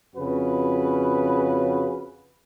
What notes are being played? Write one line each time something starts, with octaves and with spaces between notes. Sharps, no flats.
F2 C#3 F#4 B4